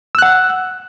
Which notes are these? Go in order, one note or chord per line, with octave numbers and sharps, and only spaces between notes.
F#5 E6 F#6